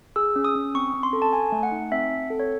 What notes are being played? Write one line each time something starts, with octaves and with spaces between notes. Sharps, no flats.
G#4 E6
C#4
D#6
C#4
C4 C#6
C4
C6
A4
A5
A4 G#5
A3
F#5
D#4
C4 E5
C4
A4
C#5